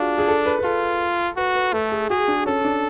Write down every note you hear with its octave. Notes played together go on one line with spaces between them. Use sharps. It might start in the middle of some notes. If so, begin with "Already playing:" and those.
Already playing: D4 F4 F#4 G#4
G#4
A4
B4
B4
F4 A4
F#4 B4
B4
A3 A4
G#4
F#4 G#4
D4
C#4 A4
D4